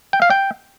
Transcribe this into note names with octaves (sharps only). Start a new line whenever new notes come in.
G5
F5
G5